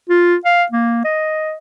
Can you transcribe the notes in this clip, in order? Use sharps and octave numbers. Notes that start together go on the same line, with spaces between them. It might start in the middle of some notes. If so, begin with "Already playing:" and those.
F4
F5
A#3
D#5